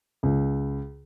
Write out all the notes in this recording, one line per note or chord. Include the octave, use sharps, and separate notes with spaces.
C#2